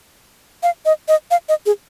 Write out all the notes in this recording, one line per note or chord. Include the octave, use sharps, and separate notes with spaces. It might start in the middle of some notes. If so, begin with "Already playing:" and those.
F5
D#5
D#5
F5
D#5
G#4